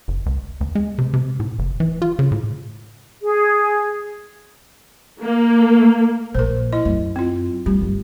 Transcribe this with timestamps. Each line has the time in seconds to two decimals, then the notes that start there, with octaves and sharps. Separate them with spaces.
0.08 F#1
0.26 C#2
0.61 D2
0.75 G#3
0.98 C3
1.13 C3
1.40 A2
1.59 F#1
1.80 E3
2.02 F4
2.19 C#3
2.32 A2
3.22 G#4
5.21 A#3
6.34 A#1 A#4 C5
6.73 E4 D#5
6.85 F#2
7.16 C4 F4
7.66 G3 G4
7.81 G1